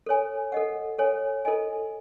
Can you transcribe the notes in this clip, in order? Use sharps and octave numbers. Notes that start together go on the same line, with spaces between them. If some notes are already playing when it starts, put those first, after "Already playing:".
A4 C#5 G#5
A4 D#5 F#5
A4 C#5 G#5
E4 A4 D#5 G#5